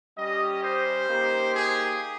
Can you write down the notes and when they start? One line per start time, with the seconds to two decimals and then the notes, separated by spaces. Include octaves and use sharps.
0.17 G3 C#4 G4 D#5
0.63 C5
1.08 A#3 D#4 G4
1.54 G#4